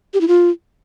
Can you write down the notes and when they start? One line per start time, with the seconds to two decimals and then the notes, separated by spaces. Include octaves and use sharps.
0.14 G4
0.21 E4
0.28 F4